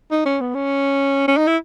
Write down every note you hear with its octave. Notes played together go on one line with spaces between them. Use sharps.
D#4
C#4
B3
C#4
C#4
D#4
E4